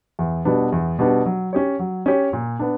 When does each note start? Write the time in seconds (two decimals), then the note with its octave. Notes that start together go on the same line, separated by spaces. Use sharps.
0.19 E2
0.45 B2 G3 B3 D4
0.72 E2
0.99 B2 G3 B3 D4
1.26 F#3
1.53 C#4 G4 C#5
1.79 F#3
2.06 C#4 G4 C#5
2.33 A#2
2.60 B3 D4